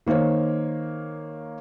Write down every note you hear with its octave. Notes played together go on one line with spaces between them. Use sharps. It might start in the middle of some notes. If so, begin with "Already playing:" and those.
D#3 A#3 D#4 C5 C#5